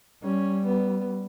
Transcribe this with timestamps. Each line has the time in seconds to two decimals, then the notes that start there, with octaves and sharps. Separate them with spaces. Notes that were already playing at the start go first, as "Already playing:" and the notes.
0.23 G3 C#4
0.65 B3